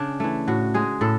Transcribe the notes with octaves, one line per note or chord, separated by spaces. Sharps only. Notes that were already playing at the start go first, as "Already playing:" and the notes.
Already playing: C#3 D4
E3 A3
A2 F#4
G#3 G#4
A2 A4